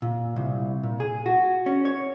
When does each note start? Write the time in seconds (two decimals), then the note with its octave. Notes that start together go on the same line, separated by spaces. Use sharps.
0.02 A#2
0.36 C2
0.83 A#2
1.00 G#4
1.26 F#4
1.66 C#4
1.85 C#5